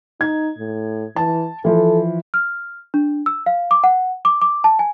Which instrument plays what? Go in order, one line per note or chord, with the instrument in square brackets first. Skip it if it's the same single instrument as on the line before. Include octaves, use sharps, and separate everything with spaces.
[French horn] D#4 [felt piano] G#6
[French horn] A2
[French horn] E3 [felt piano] A5
[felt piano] E3 F3 [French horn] A4
[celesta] F6
D4
E6
F5
D6
F#5
D6
D6
A5
G#5